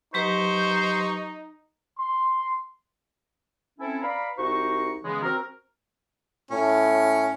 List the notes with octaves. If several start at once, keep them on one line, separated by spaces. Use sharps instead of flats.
F#3 D#4 G4 B4 C5 C#6
C6
C4 C#4 E4 A4
B4 D5 F5 A#5 B5
C2 D#4 F#4 C5 C#6
C#3 E3 G#3 B3
C4 F#4 A#4
A2 C#4